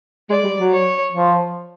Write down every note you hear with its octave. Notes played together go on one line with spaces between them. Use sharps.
G#3 D5
G3
F#3
C#5
F3